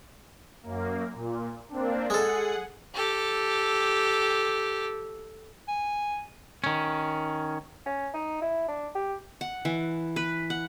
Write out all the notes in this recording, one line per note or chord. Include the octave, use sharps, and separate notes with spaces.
F#2 A#3
A#2
A#3 C4 D4
G#3 G#4 A4 F#5
G4 A4
G#5
D#3 C#4
C#4
D#4
E4
D4
G4
F#5
E3
B4
F#5